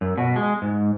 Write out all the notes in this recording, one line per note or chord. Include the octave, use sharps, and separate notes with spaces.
F#2
B2
G#3
G#2